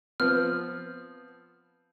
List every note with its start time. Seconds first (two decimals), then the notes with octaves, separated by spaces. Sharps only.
0.20 F3 B3 C4 F6